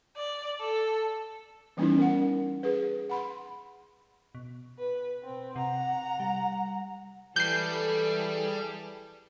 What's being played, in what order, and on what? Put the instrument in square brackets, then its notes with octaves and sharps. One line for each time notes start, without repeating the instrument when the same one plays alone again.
[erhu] D5
A4
[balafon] E3 G3 B3 C#4 D#4 E4
A#4 F#5
G#4 B4
F#5 B5 C6
[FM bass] B2
[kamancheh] B4
C4
[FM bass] C3 [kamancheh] F#5 A#5
[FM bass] G3
[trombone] E3 [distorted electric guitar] G3 [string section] G#4 A4 [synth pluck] G6 C7